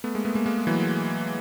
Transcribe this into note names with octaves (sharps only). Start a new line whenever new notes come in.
A3 B3
G#3 A#3
A3 B3
G#3 A#3
G#3 A#3
E3 F#3